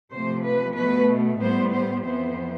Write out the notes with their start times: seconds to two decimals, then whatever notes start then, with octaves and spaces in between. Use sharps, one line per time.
0.13 C3 F3 A3 C5
0.44 B4
0.76 B2 A3 B4
1.41 A2 G3 B3 C5
1.72 C5
2.04 F2 E3 B3 C5